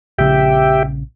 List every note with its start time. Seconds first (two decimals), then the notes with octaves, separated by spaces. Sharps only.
0.18 A#1 C#3 G4 E5 G5